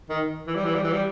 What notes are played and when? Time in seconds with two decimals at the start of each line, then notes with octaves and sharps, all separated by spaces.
0.10 D#3
0.47 E3
0.55 G3
0.65 E3
0.75 G3
0.84 E3
0.93 G3